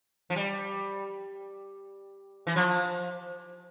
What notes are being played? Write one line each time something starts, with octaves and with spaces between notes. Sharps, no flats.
F3
G3
E3
F3